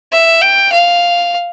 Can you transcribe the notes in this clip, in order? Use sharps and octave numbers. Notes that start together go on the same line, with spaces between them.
E5
G5
F5